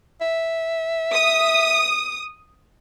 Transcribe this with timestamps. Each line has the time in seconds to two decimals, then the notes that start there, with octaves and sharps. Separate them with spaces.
0.21 E5
1.12 D#6